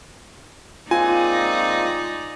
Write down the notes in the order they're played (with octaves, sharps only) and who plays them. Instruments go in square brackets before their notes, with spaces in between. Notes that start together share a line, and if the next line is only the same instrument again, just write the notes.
[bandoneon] G#3 A#3 C4 [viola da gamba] D#4 D5 [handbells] F4 [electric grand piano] G#5